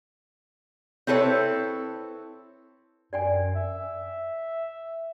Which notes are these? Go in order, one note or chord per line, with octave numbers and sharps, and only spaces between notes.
C4 E4 A4 B4 C#5
F#2 D5 G5 G#5
E5